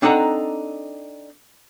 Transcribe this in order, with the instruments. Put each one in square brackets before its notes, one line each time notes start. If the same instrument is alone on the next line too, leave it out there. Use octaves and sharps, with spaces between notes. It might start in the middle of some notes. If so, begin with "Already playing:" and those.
[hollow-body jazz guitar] C4 D4 D#4 A4 F#5 A#5